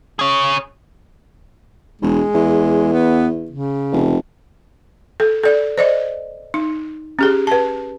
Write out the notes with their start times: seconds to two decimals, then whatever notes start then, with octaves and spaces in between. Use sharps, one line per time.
0.19 C#4 G#4
2.01 E1 G#3
2.34 E2
2.92 B3
3.51 C#3
3.92 F1
5.20 A4
5.43 A4 D5
5.78 C5 D5 D#5
6.54 D#4
7.19 C#4 G4 G#4
7.47 B4 A5